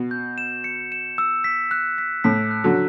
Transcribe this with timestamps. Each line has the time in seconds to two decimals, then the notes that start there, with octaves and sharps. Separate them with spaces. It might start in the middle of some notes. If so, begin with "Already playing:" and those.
Already playing: B2
0.11 G6
0.38 E7
0.64 C#7
0.92 E7
1.18 E6
1.44 B6
1.71 F#6
1.98 B6
2.24 A2 B6
2.51 F#6
2.64 D3 F#3